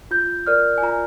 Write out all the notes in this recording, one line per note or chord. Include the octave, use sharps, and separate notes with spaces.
F4 G6
A#4 D5 F6
G#5
F4 A#5